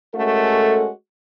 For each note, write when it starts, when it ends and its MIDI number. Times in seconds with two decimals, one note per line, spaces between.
0.15 0.88 56
0.15 0.88 57
0.15 0.88 61
0.15 0.88 66
0.15 0.88 69
0.15 0.88 70